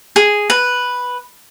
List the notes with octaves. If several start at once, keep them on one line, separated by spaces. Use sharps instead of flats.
G#4
B4